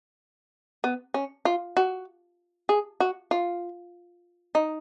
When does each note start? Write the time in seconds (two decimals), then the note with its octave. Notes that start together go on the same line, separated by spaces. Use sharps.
0.84 B3
1.14 C#4
1.45 F4
1.77 F#4
2.69 G#4
3.00 F#4
3.31 F4
4.55 D#4